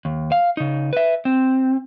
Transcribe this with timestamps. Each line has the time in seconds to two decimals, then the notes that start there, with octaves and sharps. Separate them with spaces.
0.05 D#2
0.32 F5
0.57 C#3 D#4
0.93 B4 E5
1.25 C4